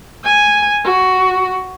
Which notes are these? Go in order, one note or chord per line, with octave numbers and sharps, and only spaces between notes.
G#5
F#4